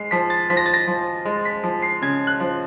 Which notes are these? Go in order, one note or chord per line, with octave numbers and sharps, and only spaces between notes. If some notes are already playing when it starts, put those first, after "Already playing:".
Already playing: G#3 C7
F3 B6
A6
F3 B6
A#6
A6
A#6
F3
G#3
B6
F3
C7
C#3 G#6
F#6
F3